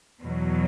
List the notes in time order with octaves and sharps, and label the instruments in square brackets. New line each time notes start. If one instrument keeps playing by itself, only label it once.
[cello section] E2 B2 F#3